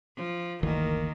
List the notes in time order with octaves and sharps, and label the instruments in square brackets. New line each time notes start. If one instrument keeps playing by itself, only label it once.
[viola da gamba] F3
[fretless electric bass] F#1 D2 E3 [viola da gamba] D#3 A#3